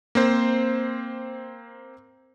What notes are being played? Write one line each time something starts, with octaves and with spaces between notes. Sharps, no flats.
A#3 C4 C5